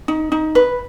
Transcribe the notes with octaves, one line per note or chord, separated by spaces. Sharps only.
D#4
D#4
B4